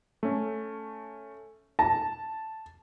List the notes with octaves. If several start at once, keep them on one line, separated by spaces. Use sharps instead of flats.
A3 C#4
A5 A#6